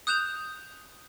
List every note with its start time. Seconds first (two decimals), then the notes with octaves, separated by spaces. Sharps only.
0.07 D#6 F#6 G6 E7 F7